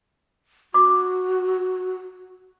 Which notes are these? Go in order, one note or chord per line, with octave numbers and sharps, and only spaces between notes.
F#4 D6